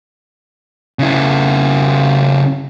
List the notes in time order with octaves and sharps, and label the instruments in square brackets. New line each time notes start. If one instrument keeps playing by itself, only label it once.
[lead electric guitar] C#3 E4